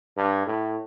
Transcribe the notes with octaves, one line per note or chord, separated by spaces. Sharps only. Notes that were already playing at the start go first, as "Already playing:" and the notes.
G2
A2